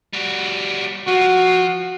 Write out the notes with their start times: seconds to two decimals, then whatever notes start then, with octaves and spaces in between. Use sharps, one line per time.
0.13 G3 F#4
1.08 F3 F#4